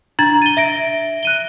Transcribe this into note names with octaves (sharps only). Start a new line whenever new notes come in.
D4 A#5 G#6 A6 F#7
D#7 G7
E5 A#6 D7
F#6 D#7 G7